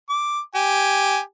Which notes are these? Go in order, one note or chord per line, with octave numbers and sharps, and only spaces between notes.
D6
G4 G#5